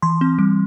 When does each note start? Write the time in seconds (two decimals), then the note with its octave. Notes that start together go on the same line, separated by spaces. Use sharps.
0.02 E3 C6
0.21 C4
0.39 G3